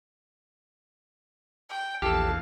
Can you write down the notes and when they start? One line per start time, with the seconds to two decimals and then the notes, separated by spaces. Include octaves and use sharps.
1.69 G5
2.02 A#1 E2 G4 A4 F5 A5